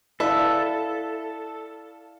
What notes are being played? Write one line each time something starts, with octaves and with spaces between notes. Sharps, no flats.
E4 A4 B4 D5 E5 F5